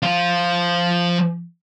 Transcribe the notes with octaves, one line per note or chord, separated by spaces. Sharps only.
F3 F4